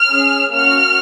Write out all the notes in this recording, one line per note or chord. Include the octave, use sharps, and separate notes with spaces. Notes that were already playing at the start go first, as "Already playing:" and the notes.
Already playing: F6
C#4 G#4
A#3 C#4 F#4 F6